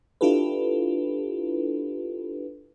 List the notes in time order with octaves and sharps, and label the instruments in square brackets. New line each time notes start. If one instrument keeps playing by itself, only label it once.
[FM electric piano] D4 E4 F4 G4 A4 B4